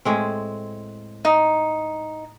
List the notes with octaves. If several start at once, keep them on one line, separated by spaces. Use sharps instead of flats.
A2 G#3 C4
D#4